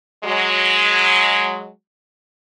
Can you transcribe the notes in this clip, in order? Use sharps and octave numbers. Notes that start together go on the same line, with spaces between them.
F#3 G#3